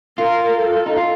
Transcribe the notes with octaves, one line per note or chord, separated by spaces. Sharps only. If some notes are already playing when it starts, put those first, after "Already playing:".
F4 A#4
A4
D#4
F4